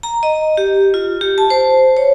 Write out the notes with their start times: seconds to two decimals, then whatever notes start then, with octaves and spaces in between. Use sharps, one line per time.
0.03 A#5
0.23 D#5
0.57 G4
0.94 F4
1.21 G4
1.38 A5
1.50 C5
1.97 C#5